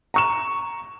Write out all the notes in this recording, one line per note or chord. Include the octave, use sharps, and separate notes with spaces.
A#5 C#6 E7